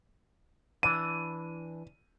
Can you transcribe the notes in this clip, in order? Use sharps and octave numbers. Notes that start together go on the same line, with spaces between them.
E3 D4 D#7